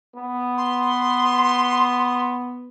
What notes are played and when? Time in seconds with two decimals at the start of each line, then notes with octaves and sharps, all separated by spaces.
0.15 B3
0.57 C6